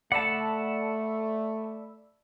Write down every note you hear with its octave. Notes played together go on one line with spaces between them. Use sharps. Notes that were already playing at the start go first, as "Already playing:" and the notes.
A3 D5 F#5 A5 B5 E6